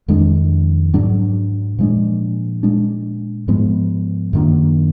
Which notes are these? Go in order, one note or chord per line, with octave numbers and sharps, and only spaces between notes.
F2 D#3 G#3 D4
G#2 F#3 D4
A#2 F3 G#3 D4
A#2 G#3 D4
G#2 F3 G#3 B3
F#2 D#3 A#3 D4